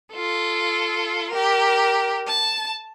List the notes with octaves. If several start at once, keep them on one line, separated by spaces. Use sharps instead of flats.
F4 A4
G4 A#4
A5